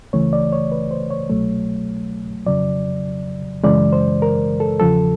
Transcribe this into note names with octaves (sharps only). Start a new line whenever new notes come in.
C#2 C#3 E3 A3 C#5
D5
C#5
B4
C5
C#5
C2 B2 F#3 A3
F2 C#3 F#3 D5
F#2 C#3 E3 G#3 D5
C5
A#4
A4
E2 C#3 F3 A4